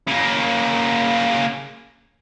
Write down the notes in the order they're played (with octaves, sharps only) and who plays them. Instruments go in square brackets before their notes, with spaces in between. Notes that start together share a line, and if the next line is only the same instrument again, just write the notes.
[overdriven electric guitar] C#3 A#3